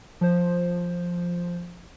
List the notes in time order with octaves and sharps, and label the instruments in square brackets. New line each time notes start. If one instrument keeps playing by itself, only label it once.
[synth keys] F3 C5